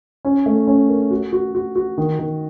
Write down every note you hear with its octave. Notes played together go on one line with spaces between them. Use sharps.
C#4
A3
C#4
A#4
F#4
F#4
F#4
F#4
D#3
D#3